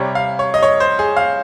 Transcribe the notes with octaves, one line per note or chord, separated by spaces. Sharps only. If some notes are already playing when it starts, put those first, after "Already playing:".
Already playing: C3 G3 C#5
F5
C#5
D#5
C#5
C5
G#4
F5